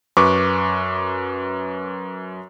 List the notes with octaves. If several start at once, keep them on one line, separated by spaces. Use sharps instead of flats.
F#2 B4 C#6 D6